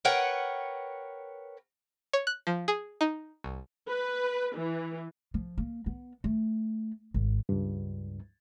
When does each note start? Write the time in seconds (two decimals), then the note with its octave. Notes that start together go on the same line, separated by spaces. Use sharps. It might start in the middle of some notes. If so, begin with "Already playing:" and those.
0.05 A#4 B4 C#5 F#5 G5
2.13 C#5
2.27 F#6
2.47 F3
2.68 G#4
3.01 D#4
3.44 C2
3.88 B4
4.56 E3
5.34 F3
5.58 A#3
5.86 B3
6.24 A3
7.14 G#1
7.49 C#2 G2